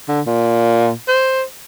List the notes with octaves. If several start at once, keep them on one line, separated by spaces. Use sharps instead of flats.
D3
A#2
C5